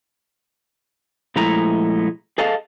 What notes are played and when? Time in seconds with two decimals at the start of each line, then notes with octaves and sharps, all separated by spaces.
1.36 A#2 F3 G#3 A3 E4 A#5
2.38 G#4 A4 D#5 F5 G#5 A5